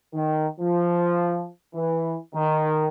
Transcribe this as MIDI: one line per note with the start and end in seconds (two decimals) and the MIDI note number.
0.14 0.47 51
0.60 1.46 53
1.74 2.16 52
2.35 2.88 51